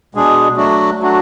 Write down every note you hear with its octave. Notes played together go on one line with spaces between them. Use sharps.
B2 G#3 D4 G#4
F#3 A3 D4 F#4
F#3 A3 D4 F#4